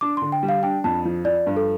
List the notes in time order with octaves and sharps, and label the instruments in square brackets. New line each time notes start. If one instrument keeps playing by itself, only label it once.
[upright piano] D4 [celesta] D6
[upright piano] D3 [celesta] C6
[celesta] G5
[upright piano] G3
[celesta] F5
[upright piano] D4 [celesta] G5
[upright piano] F2 [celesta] A5
[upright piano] F3
[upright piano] F3 [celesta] D5
[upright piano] G2
[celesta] A4